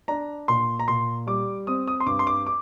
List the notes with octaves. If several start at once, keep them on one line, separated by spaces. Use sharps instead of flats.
D4 A#5
A#2 C6
A#5
A#2 C6
G3 D6
C4 D#6
D#6
C6
G2 D6
C6
D6
D6